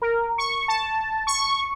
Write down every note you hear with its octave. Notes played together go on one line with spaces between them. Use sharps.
A#4
C#6
A5
C#6